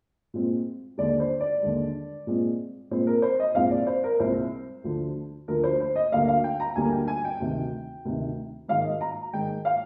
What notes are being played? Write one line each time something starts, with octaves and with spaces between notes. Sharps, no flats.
A#2 G#3 C4
D#2 D3 G#3 D5
C5
D5
D#2 D3 G#3
A#2 G#3 C4
A#2 G#3 C4 C5
A#4
C5
D#5
C2 A#2 G#3 C4 F5
D5
C5
A#4
C2 A#2 G#3 C4 C5
D2 D3 F3
D2 D3 F3 A#4
C5
C5
D#5
D2 D3 G3 A#3 F5
F5
G5
A#5
D2 D3 G3 A#3 G#5
G5
G#5
G5
D2 C3 D#3
D2 C3 D#3
G#2 D#3 G#3 F5
D#5
A#5
G#2 D#3 G#3 G5
F5